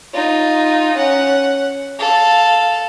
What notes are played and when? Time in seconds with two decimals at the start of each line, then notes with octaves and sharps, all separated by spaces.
0.14 D#4 F4
0.96 C#4 F#5
1.99 A4 F5